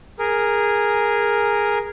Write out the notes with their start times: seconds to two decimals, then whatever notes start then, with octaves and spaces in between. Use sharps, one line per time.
0.19 G#4 A#4